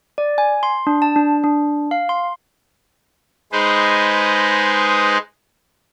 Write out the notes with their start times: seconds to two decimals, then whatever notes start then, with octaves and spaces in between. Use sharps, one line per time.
0.18 D5
0.38 G#5
0.63 C6
0.87 D4
1.02 A5
1.16 D4
1.44 D4
1.91 F5
2.09 C6
3.52 G#3 D#4 G#4 B4 C5